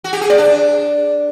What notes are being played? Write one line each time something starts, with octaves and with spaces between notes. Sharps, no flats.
F#4
G4
G#4
D5
D4